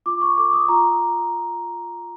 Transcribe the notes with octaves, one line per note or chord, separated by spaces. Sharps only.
F4 D6
C#6
A4 D6
D#6
F4 A#5